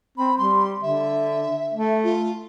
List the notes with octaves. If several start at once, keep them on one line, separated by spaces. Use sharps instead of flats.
C4 B5
G3 C6
D3 E5
A3
F4